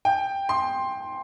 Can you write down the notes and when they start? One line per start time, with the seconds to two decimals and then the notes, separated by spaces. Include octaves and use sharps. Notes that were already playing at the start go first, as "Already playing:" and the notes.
0.05 G5
0.49 C6